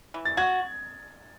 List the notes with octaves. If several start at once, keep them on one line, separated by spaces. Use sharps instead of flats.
E3
A6
F#4 G#6